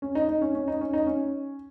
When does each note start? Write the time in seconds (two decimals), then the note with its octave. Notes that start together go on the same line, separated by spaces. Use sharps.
0.02 C#4
0.15 D#4
0.28 D#4
0.41 C#4
0.55 C#4
0.68 D#4
0.81 C#4
0.93 D#4
1.07 C#4